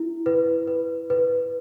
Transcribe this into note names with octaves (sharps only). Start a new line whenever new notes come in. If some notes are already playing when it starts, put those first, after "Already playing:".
Already playing: E4
B4
B4
B4